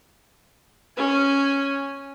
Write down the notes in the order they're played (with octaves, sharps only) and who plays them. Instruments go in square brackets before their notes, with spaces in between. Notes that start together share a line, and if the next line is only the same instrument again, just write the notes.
[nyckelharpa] C#4 G#5